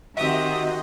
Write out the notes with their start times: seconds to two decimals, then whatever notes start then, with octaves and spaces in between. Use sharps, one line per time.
0.17 D#3 C4 F#4 G4 D#5 E5 D#6